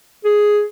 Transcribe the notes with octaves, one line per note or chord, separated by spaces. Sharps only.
G#4